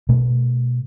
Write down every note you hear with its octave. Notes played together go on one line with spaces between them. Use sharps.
B2 A3